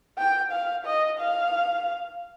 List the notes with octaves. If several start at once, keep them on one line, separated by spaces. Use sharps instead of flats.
G5
F5
D#5
F5